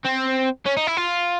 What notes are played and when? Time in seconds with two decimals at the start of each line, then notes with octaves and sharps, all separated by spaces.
0.05 C4
0.66 C#4
0.77 D#4
0.87 E4
0.97 F4